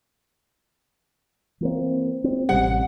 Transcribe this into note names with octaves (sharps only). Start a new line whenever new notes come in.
E3 A#3 C4
C4
A1 C3 G3 F#5